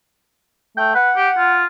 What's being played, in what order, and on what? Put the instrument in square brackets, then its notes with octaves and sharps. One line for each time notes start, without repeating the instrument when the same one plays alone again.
[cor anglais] A3 [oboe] G5
[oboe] B4 [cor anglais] F#5
[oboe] G4
F4